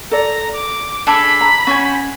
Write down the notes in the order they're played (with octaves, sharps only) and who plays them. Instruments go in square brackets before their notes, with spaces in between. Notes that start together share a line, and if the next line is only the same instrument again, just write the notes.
[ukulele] A4 D5 [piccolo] A#5
[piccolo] D6
[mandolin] D4 G#4 A4 [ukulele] A5 [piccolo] B5
[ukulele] A#5
[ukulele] C#4 [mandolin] F#4 C5 G#5